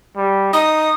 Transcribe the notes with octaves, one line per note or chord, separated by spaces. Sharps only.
G3
D#4 D#6